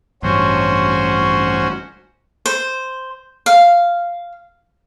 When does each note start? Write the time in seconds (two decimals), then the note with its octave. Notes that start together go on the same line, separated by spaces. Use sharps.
0.23 A1 G2 C#4 F#4 C5
2.46 C5
3.46 F5